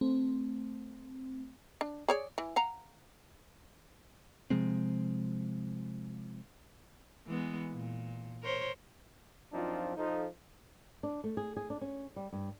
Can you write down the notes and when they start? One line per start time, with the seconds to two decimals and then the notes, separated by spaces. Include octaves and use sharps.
0.01 A3 C4
1.81 D4
2.08 G#4 C#5 D5
2.38 E3
2.56 F5 F#5 A#5
4.50 C3 F3 G#3 C4
7.27 E3 G#3 B3
7.72 A#2
8.43 A#4 C5 C#5
9.53 F#2 F3 C4 D4 D#4 F4
9.97 F3 D#4 A4
11.03 D4
11.24 A3
11.37 G#4
11.57 G#4
11.70 D4
11.81 C#4
12.16 G3
12.33 G2